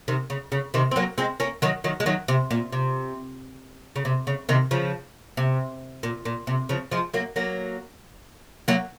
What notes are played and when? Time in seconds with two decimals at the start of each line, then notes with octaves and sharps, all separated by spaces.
0.08 C3 D#3
0.30 C#3
0.52 C#3
0.74 C3 D#3
0.91 C4
0.96 F#3 A#3
1.18 G#3 C4
1.40 A#3 C#4
1.62 D#3 F#3
1.84 D#3 F#3
2.00 G#3
2.06 D#3 F#3
2.28 C3
2.51 A#2
2.72 C3
3.96 C#3
4.05 C3
4.27 C#3
4.49 C3 D#3
4.71 C#3 F3
5.37 C3
6.03 A#2
6.25 A#2
6.47 C3
6.69 C#3 F3
6.91 F3 G#3
7.14 F#3 A#3
7.36 F#3 A#3
8.68 F#3 A#3